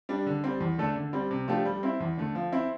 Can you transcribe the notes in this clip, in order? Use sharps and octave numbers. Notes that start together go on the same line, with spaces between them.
G3 D4
D3
G3 C4
E2
D3 A3 D4 A4
D3
G3 C4
C3
F3 A3 D4 G4
G3
C4 E4
E2
D3 A3
F3
C4 E4